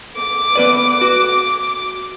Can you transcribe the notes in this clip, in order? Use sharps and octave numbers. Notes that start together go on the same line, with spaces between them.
D6
B3 B4 D5
F#4